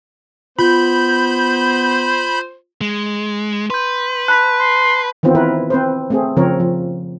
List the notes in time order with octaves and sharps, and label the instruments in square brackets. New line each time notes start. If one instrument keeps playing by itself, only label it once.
[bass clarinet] B3 [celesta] F4 [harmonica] C5 [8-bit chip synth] B5 G6
[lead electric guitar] G#3
[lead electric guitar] B4 [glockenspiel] C6 G6
[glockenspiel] A5 B5 B6 [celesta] F#6
[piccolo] C6
[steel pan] D#3 E3 B3 C4 F4
E4 A#4 B4
C4 B4 C5
A3 C4 G#4
C#3 F3 C4 A#4 C#5
F3